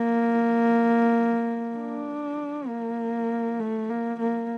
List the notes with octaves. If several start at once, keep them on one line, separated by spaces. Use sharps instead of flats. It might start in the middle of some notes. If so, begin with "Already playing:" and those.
Already playing: A#3
D4
A#3
A3
A#3
A#3